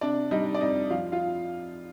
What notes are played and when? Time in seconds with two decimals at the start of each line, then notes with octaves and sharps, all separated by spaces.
0.01 C3 D4 D5
0.31 G3 D#4 D#5
0.54 D5
0.61 F2 D#4 D#5
0.91 F3 F4 F5
1.12 F4 F5